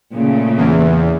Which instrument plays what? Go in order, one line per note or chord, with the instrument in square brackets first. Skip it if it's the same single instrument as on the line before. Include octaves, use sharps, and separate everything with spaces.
[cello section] A#2 C#3 A3
[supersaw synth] E2